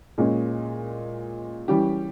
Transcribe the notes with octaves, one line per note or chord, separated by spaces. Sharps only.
A#2 G#3 C#4
E3 G3 C#4 G4